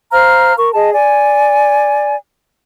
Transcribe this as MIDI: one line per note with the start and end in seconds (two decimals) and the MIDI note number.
0.12 0.54 72
0.12 0.54 77
0.12 0.54 82
0.12 0.54 89
0.58 0.71 70
0.58 0.71 85
0.73 0.93 68
0.73 0.93 75
0.73 0.93 81
0.93 2.17 74
0.93 2.17 80